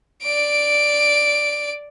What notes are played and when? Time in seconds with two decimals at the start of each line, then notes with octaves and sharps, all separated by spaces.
0.23 D5 D7